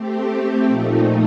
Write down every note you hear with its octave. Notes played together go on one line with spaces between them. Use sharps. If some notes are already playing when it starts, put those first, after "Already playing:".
Already playing: A3 C4 G4
A#2 F3 A3 D#4